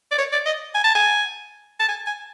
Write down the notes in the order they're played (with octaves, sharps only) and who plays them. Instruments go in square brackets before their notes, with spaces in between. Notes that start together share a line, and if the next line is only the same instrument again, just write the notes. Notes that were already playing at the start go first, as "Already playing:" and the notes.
[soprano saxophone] D5
C#5
D5
D#5
G#5
A5
G#5
A5
G#5
G#5